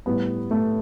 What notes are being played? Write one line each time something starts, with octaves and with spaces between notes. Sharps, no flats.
A2 G3 B3
A3